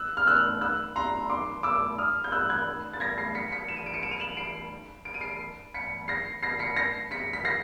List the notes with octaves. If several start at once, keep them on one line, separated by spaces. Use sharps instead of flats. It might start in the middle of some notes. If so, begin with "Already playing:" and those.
Already playing: E6 F#6
F6
E6 F#6
E6 F#6
A#5 C6
C6 D6
D6 E6
D#6 F6
G6
E6 F#6
F#6 G#6
A6
G#6 A#6
A#6 C7
B6 C#7
B6 C#7
E7
D#7
D7
C#7 D#7
D7 E7
D#7 F7
E7 F#7
C7 D7
D7
D#7
C7 D7
B6 C#7
A#6 C7
A#6 C7
B6 C#7
A#6 C7
B6 C#7
B6
A#6 C7